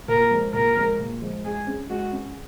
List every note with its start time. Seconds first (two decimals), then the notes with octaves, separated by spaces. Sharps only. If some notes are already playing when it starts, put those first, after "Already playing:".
0.08 A#2 A#4
0.31 F3 G#3
0.53 A#2 A#4
0.76 F3 G#3
0.99 A#2
1.22 F3 G#3
1.44 G#3 G#4
1.67 C#4 G#4
1.90 G#3 F#4
2.12 C#4 G#4